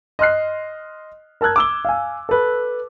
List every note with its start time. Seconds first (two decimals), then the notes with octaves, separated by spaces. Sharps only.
0.19 D#5 C6 F6 F#6 C7
1.41 A#4 A5 E6 F#6 G#6
1.56 D6 E6 G7
1.85 F5 G#5
2.29 A4 B4